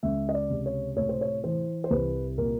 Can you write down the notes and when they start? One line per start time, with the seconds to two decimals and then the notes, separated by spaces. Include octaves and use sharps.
0.03 C#2 E5
0.29 D#5
0.34 D5
0.50 C3
0.66 C#5
0.96 A2 C#5
1.09 C5
1.21 C#5
1.44 E3 C5
1.84 C5
1.90 C2 B4
2.38 A#2 A#4